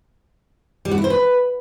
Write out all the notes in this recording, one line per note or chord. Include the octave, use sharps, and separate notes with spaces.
G3
F#4
E4
C5
B4